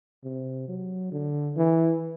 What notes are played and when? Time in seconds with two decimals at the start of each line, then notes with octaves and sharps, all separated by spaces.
0.24 C3
0.68 F#3
1.12 D3
1.56 E3